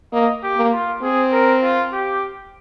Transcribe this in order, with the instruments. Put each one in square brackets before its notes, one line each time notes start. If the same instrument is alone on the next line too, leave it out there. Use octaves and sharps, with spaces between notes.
[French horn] A#3 [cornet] D#5
[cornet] G4
[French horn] A#3
[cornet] F4
[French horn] C4 [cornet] G#4
[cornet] A#4
F4
G4